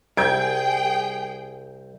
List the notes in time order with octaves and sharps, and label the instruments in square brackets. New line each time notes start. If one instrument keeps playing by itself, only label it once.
[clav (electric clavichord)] C2 [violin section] G#4 G5 [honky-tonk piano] G6 G#6 D7